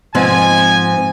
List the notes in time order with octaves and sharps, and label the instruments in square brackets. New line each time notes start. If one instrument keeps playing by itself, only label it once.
[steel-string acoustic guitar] G#2 F3 C4 [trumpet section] G#5